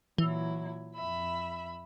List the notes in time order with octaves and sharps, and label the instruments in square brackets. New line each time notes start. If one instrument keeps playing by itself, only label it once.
[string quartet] A#2 F#3 E4 [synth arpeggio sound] E3
[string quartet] F2 E5 B5